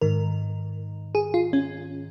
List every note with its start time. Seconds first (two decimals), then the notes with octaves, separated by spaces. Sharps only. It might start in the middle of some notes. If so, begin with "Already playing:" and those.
0.01 G#2 D#3 A#4
1.15 G#4
1.34 F4
1.53 C#4